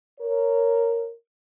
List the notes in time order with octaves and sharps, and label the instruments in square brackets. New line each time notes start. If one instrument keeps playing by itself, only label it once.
[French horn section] A#4 C#5